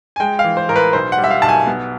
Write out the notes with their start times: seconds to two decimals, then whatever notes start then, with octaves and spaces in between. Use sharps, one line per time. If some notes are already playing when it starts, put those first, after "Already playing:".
0.16 G#5
0.20 G#3 G5
0.39 F5
0.44 E3
0.57 C5
0.69 A1 A#4
0.76 B4
0.93 B1 C5
1.12 F#5
1.18 G3
1.24 E5
1.31 F5
1.42 B1 A5
1.49 G#5
1.67 B3